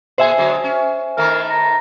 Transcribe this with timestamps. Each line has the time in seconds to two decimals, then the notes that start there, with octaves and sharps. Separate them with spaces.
0.18 A#2 G#4 C5 E5 G#5
0.38 D3 F#3 G#3
0.64 C#4
1.17 A2 D#3 A3 A#4
1.50 A#5